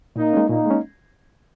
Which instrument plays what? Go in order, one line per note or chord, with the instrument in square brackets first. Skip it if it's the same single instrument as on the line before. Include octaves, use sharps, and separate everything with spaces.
[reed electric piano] A#2 [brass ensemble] A#3 D#4
[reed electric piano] G#3 C#4
[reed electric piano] A#2 [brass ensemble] A#3 D#4
[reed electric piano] G#3 C#4